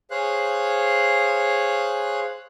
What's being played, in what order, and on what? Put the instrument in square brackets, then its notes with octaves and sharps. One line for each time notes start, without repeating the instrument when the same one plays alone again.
[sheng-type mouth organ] G#4 C5 C#5 F5 F#6